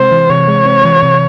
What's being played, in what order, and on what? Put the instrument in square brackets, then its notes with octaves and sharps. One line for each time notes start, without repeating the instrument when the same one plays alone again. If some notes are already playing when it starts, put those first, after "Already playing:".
Already playing: [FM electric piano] C3 G#3 C4 [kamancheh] C5
[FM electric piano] E3
[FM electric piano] C3 [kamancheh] C#5
[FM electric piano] G#3
C4
E3
C3